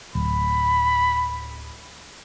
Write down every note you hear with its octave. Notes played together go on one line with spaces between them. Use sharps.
D1 B5